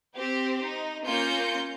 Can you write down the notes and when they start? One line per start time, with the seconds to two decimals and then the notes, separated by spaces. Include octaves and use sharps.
0.16 C4 G4 C5
0.64 D#4
1.05 A#3 C#4 F4 G6 A#6 C#7